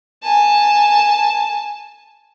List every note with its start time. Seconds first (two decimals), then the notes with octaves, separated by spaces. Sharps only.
0.23 G#5 A5